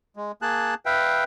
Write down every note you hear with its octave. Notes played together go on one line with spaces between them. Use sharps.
G#3
A#3 G#4 A5 F#6
B4 E5 F5 G5